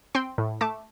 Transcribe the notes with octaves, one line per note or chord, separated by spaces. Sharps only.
C4 G5 C6
A2
A3 A5 D6